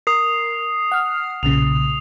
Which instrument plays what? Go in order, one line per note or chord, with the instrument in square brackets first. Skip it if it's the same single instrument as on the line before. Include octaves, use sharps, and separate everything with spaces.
[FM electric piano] A#4 [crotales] D#6 C7
[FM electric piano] F#5 F6
[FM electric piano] B1 A#2 C#3 [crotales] F7